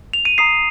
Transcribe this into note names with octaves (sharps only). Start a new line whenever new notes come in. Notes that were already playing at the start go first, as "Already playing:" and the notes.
F7
D#7
A#5 D#6 C7